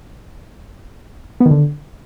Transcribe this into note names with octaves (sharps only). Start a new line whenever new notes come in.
B3
D#3
D3